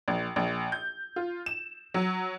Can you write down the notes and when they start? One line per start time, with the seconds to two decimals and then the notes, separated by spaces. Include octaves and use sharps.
0.08 A#1
0.36 A#1
0.72 G6
1.16 F4
1.46 E7
1.94 F#3